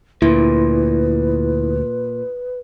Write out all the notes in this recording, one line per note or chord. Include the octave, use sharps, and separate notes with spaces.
D2 A#2 E4 B4